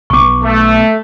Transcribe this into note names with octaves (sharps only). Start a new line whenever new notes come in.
B1 B3 C#6 D6
A3